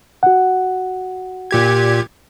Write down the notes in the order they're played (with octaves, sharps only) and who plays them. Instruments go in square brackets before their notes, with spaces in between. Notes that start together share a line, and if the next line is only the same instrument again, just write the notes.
[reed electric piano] F#4 F#5
[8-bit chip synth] A#2 G4 G#6